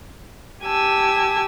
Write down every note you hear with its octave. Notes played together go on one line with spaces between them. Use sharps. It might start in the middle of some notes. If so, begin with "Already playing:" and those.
G4 G#5 A5 E6